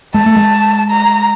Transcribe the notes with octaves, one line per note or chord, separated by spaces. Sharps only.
G#3 A5
A3
G#3
A#5